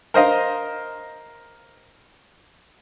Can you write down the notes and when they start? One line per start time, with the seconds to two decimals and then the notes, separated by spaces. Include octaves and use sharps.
0.14 A#4 C5 D#5 F5